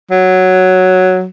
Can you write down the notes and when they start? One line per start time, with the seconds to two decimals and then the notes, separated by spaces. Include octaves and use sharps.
0.11 F#3